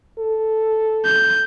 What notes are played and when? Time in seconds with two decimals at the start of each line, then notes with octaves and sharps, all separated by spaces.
0.19 A4
1.05 G6